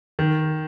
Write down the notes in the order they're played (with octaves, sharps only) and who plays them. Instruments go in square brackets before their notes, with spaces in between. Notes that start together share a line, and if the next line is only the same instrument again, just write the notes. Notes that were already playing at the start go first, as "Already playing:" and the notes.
[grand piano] D#3